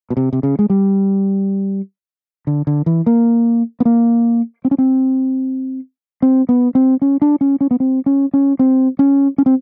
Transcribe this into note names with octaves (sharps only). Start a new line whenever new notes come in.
B2
C3
C3
C#3
G#3
G3
D3
D3
E3
A#3
B3
A#3
C4
C#4
C4
C4
B3
C4
C#4
D4
C#4
C#4
B3
C4
C#4
C#4
C4
C#4
C#4
C4